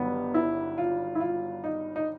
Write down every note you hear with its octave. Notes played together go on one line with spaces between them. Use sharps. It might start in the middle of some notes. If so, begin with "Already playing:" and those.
Already playing: G1 G2 D#3 F#3 B3
E4
F4
E4
F4
D#4
D#4